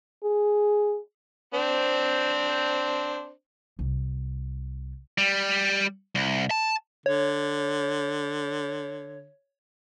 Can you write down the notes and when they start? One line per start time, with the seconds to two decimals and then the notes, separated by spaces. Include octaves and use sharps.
0.24 G#4
1.54 C4 D4 C5
3.79 C2
5.18 G3
6.15 C2
6.51 A5
7.06 D3 C#5